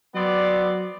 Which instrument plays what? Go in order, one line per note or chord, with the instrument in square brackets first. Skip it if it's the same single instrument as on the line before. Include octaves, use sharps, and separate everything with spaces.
[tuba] F#3 [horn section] B3 C4 D5